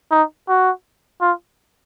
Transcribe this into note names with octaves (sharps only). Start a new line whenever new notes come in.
D#4
F#4
F4